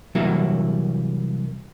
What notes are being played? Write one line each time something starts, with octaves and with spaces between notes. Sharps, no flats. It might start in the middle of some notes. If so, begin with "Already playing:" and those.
C2 E3 F#3 G3 A#3 E4